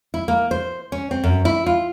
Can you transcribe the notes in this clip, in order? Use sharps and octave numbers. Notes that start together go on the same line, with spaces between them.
E4
A#3
C5
C#4
C4
F#2
E4
F4